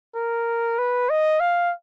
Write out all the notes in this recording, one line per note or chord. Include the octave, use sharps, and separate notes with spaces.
A#4
B4
D#5
F5